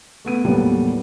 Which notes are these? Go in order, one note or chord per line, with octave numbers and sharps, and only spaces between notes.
A3 B3 D#7
D#2 A2 C3 F#3 G3 B3